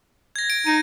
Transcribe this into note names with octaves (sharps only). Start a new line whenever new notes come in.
G#6 A#6
D7
D#4 D#7